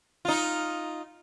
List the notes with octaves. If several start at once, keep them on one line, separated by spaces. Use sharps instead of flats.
D#4 F4